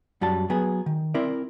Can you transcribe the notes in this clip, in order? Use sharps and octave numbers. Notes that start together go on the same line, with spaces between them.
F#2 G3 F#4 A5
F#3 B3 G#4
D#3
C4 E4 A#4 D5